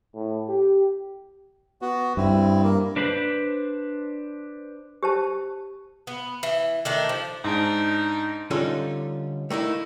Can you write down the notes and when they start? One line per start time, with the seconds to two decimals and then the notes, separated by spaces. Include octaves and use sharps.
0.15 A2
0.48 G4
1.82 B3 F#4
2.17 G2 C4 E4
2.63 A#3
2.96 D4 B4 C5 B5
5.03 G4 C5 A5
6.07 B3
6.43 E3
6.85 D#3 A3 D4
7.09 F3
7.44 G#2 D4 D#4
8.51 D3 G3 C#4 D#4 F4 A4
9.50 A3 A#3 D#4 E4